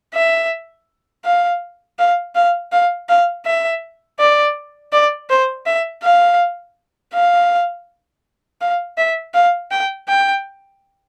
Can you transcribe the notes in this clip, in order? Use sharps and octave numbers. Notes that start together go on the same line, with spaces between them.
E5
F5
F5
F5
F5
F5
E5
D5
D5
C5
E5
F5
F5
F5
E5
F5
G5
G5